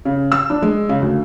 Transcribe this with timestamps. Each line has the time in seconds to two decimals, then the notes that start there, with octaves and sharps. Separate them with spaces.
0.05 C#3
0.32 E6
0.50 D4
0.62 G#3
0.89 C#3
1.01 D2